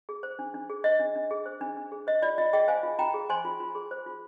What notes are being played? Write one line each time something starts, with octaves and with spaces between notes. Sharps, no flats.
G#4
C5
D4
D4
G#4
C5 D#5
D4
D4
G#4
C5
D4
D4
G#4
C5 D#5
F4 D5
F4 D#5
G#4 D#5 G5
C5 F5 G#5
F4
F4 G5 A#5
G#4
C5 G#5 C6
F4
F4
G#4
C5
F4